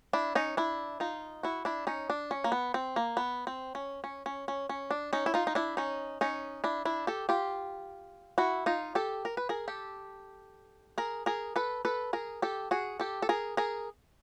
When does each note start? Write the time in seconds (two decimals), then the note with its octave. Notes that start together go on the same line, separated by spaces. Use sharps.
0.13 D4 E4
0.35 C#4 D#4
0.57 D4 E4
1.00 D#4 F4
1.43 E4 F#4
1.65 D4 E4
1.87 C#4 D#4
2.10 D4
2.31 C#4
2.44 A#3
2.52 B3
2.74 C4
2.96 A#3
3.17 B3
3.47 C4
3.75 C#4
4.04 C#4
4.26 C#4
4.48 C#4
4.69 C#4
4.91 D4
5.13 C#4 D#4
5.26 E4
5.34 D#4 F4
5.47 D#4
5.55 D4 E4
5.77 C#4 D#4
6.21 C#4 D#4
6.64 D4 E4
6.85 D4 E4
7.07 G4 A4
7.29 F4 G4
8.38 E4 F#4
8.66 D#4 F4
8.95 G4 A4
9.25 A#4
9.37 B4
9.49 G#4 A#4
9.68 G4 A4
10.98 G#4 A#4
11.26 G#4 A#4
11.56 A4 B4
11.85 A4 B4
12.13 G#4 A#4
12.42 G4 A4
12.71 F#4 G#4
13.00 G4 A4
13.22 A4
13.29 G#4 A#4
13.57 G#4 A#4